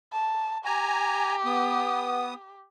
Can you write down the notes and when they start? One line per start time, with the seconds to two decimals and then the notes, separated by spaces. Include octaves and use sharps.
0.13 A5
0.65 G4 G#5 A#5
1.45 B3 D#6